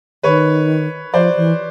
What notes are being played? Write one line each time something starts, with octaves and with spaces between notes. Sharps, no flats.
D#3 B4 C#5
F3 C5 D5
E3